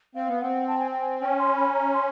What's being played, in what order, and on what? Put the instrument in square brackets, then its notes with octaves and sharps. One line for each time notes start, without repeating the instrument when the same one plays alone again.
[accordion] C4 [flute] F5
[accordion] B3
[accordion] C4 [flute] F#5
[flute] A5
G#5
G5
G#5
[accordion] C#4 [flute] G5
[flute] C6
B5
A#5
C6